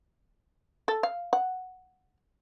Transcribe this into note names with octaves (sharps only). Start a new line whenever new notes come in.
A4
F5
F#5